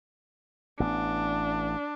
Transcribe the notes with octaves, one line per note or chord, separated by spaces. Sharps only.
A1 B3 D4